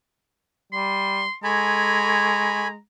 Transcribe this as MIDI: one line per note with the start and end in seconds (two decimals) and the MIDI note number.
0.73 1.24 55
0.73 1.35 84
1.44 2.79 56
1.44 2.68 69
1.44 2.68 80
1.44 2.76 82
1.44 2.68 83
1.44 2.68 85
1.44 2.68 92